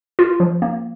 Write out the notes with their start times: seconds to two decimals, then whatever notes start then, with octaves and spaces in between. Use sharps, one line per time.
0.19 F4
0.40 F3
0.62 A#3